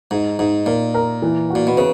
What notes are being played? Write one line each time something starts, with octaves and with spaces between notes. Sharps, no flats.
G#2 D#4
G#2 D#4
A#2 A#4
A#4
E3
F#4
A#2
B2
C#3 B3